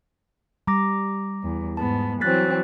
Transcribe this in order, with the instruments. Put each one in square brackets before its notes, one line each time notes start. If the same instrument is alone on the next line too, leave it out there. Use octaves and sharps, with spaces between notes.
[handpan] G3 [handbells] A#5 D6 A#6
[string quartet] E2
[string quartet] G#2 B3 [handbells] A5
[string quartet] E3 F#3 C4 [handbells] F#6 A6 B6